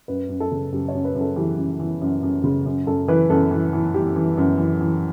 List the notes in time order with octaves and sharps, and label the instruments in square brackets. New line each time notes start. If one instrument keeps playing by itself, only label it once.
[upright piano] F#2 B4
F#2
A4
C#3
F#2 G4
C#5
F#2
B4
F#2
A4
E3 G4
F#2
E3
F#2
F#2
C#3
F#2
F#2 A4
E3 B4
F#2 A4
E3
E3
E3 G4
E3
F#2
E3
E3